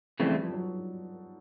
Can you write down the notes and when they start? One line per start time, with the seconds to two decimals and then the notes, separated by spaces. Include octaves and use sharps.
0.20 F2 C#3 E3 G3 A3 C4
0.31 G3
0.42 F3
0.53 F#3